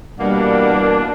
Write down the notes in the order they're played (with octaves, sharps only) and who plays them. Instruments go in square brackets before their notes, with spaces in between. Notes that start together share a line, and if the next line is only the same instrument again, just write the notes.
[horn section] B2 E3 A#3 [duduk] G3 [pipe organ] D4 [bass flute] F#5